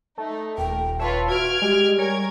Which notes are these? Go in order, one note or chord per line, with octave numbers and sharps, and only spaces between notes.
A3 D#4
D#1 A#4 G5
F4 B4 C#5 E5 A5
F#4 F6 G#6 D7
G3 G#3 G4
A#4 C#5 G#5 G#6